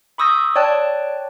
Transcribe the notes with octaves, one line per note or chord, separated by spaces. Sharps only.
B5 C#6 D#6 E6 G6 A#6
C#5 D5 G5 A5 F#6